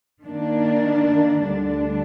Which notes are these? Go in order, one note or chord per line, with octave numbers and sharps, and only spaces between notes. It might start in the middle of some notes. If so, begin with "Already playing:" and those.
D#3 A#3 D4
D2 D3 G3 D4